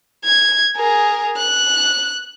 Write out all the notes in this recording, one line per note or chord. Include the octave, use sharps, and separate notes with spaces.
G#6
G#4 A#4
F#6